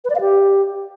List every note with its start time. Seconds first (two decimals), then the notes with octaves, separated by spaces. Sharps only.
0.05 B4
0.10 D5
0.15 F5
0.21 G4